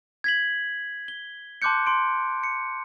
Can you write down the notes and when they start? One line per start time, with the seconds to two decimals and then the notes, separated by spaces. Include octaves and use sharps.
0.24 G#6 B6 F#7
1.08 G7
1.62 A5 C6 D6 F#6 G6 C#7
1.86 C6 D7
2.43 C#7